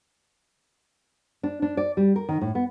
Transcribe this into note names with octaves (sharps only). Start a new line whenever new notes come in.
D4
D4
D5
G3
A#4
D#3
A2
B3